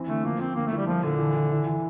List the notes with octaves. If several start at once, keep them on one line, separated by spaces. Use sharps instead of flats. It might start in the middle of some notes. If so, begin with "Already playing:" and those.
Already playing: E3 C4
D3 A3
F3 A#3
F3 C4
D3 A#3
A3
E4
G3
F3 A#3
A#2 D3
E3
E3
E3
E3